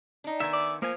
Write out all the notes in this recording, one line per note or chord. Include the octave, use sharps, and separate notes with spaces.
D4 D#4
D#3 B3 E5 G#5
D5
F3 A#3 G#5